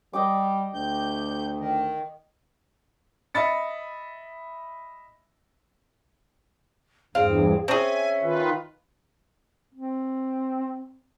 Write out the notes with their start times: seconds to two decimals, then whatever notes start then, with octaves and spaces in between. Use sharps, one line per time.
0.13 G3 D#5 G5 D6
0.74 D2 G6
1.59 D#3
3.34 D#5 E5 B5 A6 C#7
7.15 E2 G2 C4 G#4 F5
7.68 C4 C#4 G#4 E5 G#5
8.23 D#3 F4 B4
9.75 C4